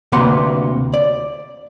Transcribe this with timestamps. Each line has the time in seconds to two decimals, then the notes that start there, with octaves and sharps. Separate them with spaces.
0.12 D2 C3 A#3 B4 F#5 C6
0.94 D5